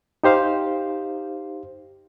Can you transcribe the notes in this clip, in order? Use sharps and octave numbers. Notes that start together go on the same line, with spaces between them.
D#4 G4 C5 F5